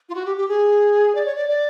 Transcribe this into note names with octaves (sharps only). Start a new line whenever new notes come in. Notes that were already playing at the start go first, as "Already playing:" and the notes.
F4
F#4
G4
G4
G#4
D5
C#5
D5
D5